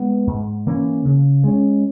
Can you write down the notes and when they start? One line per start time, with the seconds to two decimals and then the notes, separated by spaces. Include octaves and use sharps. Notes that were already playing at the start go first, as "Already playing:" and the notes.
Already playing: G#3 B3
0.27 G#2
0.66 E3 A#3 C#4
1.05 C#3
1.44 G#3 C#4